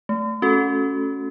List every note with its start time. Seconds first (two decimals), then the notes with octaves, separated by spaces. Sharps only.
0.09 A3
0.42 C#4 F#4 A4